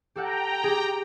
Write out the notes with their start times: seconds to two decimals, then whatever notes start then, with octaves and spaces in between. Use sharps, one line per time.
0.16 G4 A4 F#5 G5 A#5
0.63 G4 G#4